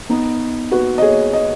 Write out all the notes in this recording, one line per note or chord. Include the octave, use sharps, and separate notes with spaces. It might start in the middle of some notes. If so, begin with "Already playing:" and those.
B3 D#4
F#4 B4
D#5
G#4 C#5
D#5